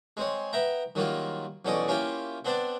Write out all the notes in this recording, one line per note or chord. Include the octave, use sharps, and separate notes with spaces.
G#3 C4 C#5
B3 E5 G5 A#5
D#3 F#3 G3 A#3 F4
B1 E2 C#4 A4 D5 D#5
A#3 C#4 E4 F4 G4 G5
B3 C4 D4 D5 A5